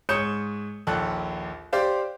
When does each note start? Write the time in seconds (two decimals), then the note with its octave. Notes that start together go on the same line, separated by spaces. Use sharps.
0.09 G#2 C#5 D#6 G6 C#7 E7
0.87 A#1 D#2 A4 F#6
1.73 G4 C5 D5 F5